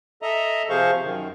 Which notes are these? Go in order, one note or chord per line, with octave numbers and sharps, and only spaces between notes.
A4 D#5 E5 A#5
C3 F3 G#4 C5 F5 C#6
F#2 D#3